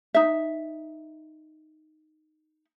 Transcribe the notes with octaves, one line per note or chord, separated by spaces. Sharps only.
D#4 E5